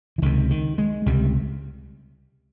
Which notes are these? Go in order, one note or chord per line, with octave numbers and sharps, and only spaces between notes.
E3
C#2 C3 D#3
D#3
G#3
C#2 C3 G3